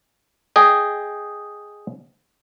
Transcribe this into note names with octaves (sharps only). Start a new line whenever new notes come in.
G#4 D#5 G5